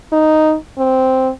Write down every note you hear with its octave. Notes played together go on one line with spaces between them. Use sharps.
D#4
C4